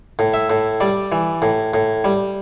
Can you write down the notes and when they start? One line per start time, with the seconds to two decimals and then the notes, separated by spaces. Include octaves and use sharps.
0.19 A2
0.34 E5
0.50 A2
0.80 G3 D5
1.12 E3
1.42 A2
1.74 A2
2.04 G3